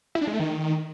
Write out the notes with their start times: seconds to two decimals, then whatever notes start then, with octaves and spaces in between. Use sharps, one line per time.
0.15 E4
0.21 D4
0.27 G#3
0.34 A3
0.40 D#3